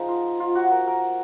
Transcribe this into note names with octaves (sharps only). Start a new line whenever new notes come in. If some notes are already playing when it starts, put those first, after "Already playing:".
Already playing: F3 G#3 D#4
F4
F4
F#4
A#4
A#4